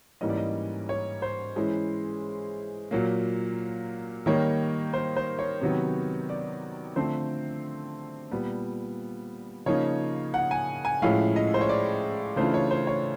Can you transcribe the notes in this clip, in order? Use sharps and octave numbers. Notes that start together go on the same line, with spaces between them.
G#2 E3 G3 A#3 C#4 D#5
D5
D#5
C#5
C5
E3 G#3 C#4 E4
A#2 F#3 A#3
D#3 G3 A#3 D#4 C#5
C5
C5
C#5
C3 D#3 F#3 B3
D5
D3 F3 A3 C4 C5
A#2 G3 B3
C#3 F3 A#3 D#4 C#5
F#5
G#5
G#5
A2 F3 G#3 C#4 E4 F5
D#5
C5
C#5
D5
C#3 E3 A3 D4 F4 C5
C#5
C5
C#5